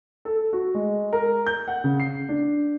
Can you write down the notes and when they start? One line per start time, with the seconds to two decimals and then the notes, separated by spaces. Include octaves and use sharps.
0.25 A4
0.53 F#4
0.75 G#3
1.13 A#4
1.46 G6
1.68 F#5
1.84 C#3
2.00 C7
2.29 D4